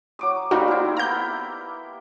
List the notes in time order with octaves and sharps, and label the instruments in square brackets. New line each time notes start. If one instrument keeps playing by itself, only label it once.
[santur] F#3 D6 D#6
[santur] G3 A3 A#3 [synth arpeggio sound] D#4 F#4
[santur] C4 E4
[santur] A#3 B3 [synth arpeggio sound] A#5 G6